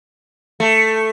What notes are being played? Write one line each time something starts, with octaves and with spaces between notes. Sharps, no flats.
A3